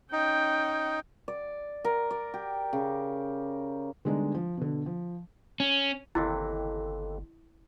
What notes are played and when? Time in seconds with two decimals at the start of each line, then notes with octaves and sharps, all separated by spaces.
0.13 C#4 D#4 G5
1.28 D5
1.85 A#4
2.11 D5
2.34 G4
2.73 C#3
4.05 D3 G3 G#3 B3 D4 D#4
4.35 F3
4.57 B2 D3
4.86 F3
5.60 C#4
6.15 G1 D#2 C3 E3 E4 A4